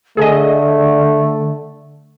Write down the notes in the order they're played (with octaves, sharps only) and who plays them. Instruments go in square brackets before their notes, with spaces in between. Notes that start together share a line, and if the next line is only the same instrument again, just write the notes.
[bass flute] D3 [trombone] A3 [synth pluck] G#4 A4 D#5